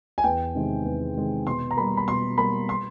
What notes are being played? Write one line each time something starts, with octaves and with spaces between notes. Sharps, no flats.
G#5
E2 G5
C3 D#3 G#3
E2
C3 D#3 G#3
B2 C6
A#5
G3 A#3 B5
B5
B2 C6
G3 A#3 B5
C6